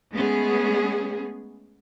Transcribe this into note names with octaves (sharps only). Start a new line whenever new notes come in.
G#3 A3 B3 C#4 G#4